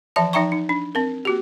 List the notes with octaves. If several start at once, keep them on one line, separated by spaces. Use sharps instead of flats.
E3 F3 E5 A5
F3 D#4 E5 G5 A#5 C#6
D#4
D4
C4 A#4
A#3 F#4 G4